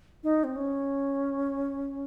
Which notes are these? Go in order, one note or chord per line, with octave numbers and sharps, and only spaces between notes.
D#4
C4
C#4